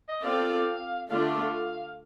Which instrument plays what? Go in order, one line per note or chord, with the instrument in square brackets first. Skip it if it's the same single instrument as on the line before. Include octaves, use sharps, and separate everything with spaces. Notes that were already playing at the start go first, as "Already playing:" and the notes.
[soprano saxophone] D#5
[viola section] C4 F4 A4 D5 [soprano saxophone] F5
[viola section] D3 A3 D4 F4 A4 [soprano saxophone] F5